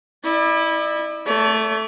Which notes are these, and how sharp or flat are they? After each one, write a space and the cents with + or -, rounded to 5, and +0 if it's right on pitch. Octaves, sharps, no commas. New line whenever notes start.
E4 -15 D5 +35
A3 +0 D5 -45